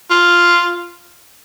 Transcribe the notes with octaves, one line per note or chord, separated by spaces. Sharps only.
F4